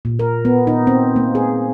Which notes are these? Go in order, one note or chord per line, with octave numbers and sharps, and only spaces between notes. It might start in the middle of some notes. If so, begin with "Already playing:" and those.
A#2
A#4
B3
D#4
C4
A#3
G#4